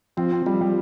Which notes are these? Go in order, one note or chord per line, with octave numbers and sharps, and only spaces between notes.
F3 C4
C4
F3 G3
G3